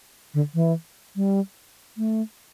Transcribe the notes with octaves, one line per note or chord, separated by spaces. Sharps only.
D3
E3
G3
A3